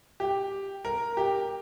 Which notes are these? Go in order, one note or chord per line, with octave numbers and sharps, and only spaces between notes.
G4
A#4
G4